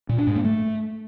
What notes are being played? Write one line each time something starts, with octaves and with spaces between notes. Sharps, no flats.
A#2
D4
G#2
A#3
A3